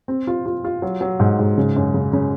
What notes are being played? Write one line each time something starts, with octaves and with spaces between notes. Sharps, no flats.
C4
F4
F4
F4
F#3
F#3
G#2
G#2
C#3
F#2
C#3
C#3